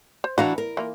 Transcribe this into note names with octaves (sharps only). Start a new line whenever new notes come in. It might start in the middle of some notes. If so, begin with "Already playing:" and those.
C5
E3 D4 F#4 B4 F5 A#5
A#4
E3 A#3 F4